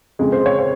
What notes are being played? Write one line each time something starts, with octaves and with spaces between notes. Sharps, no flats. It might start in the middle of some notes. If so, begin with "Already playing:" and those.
F2 C#3 G#3
C5
C#5
C#5